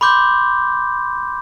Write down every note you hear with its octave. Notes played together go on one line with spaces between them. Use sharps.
B5 C6 D6 G6